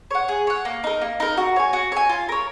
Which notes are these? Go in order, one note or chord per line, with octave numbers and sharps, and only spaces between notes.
C#5 F#5
G#4
C#5 F#5
A#3
D#4 A#4
A#3
D#4 A#4
F#4
C#5 G#5
F#4
C#5 G#5
F4
A#4 C#5